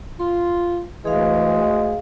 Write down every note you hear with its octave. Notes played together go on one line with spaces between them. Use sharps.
F4 C6
D2 E3 G#3 G#4 F5